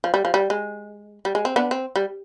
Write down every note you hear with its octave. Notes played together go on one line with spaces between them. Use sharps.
F3
G3
F3
G3
G#3
G3
G#3
C4
B3 D4
C4
G3